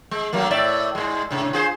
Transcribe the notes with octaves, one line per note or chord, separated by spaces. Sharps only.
G#3
F#3 A3 A#3
A2 D5 E5
G#2 G#3
A2 C3
F4 G#4 C5